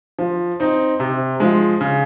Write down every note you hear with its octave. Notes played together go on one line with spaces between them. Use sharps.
F3
C4 D#4
C3
F3 G#3
C#3